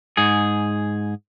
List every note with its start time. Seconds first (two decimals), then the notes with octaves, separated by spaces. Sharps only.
0.17 G#2 G#4